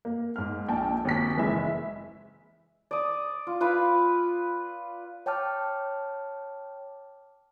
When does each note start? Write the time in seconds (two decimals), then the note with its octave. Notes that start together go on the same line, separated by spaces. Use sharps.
0.05 A#3
0.36 G#2 F6
0.68 A#1 G5 A5
1.05 G#1 D#2 B6
1.37 F#1 E3 G#3 E4 E5
2.91 D5 D#6
3.47 F4
3.61 F4 B4 F5 B5
5.26 C#5 G5 A5 D6 F6